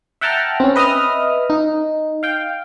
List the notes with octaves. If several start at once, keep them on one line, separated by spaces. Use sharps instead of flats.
E5 F#5 G5 A5 A#5 F6
C4 C#4
B4 D#5 E5 D#6 F6
D#4
F5 G5